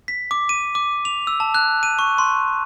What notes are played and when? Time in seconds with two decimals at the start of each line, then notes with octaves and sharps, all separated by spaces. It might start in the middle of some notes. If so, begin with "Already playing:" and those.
0.08 B6
0.31 D6
0.49 D#7
0.75 D6
1.05 F7
1.27 E6
1.40 A5
1.54 F#6
1.83 D#7
1.99 C#6
2.18 C6